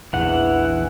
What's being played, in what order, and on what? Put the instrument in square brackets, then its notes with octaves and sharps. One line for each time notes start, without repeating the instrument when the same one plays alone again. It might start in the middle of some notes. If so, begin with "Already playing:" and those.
[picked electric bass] A#1 E2 [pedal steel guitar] E3 F#5